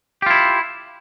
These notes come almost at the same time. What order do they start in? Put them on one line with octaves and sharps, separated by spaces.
G4 F4 E4